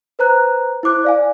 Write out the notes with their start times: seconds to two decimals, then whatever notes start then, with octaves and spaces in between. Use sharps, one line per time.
0.19 B4 C5 A#5 F#6
0.83 E4 C5 D6 F#6
1.04 D5 F5 G#5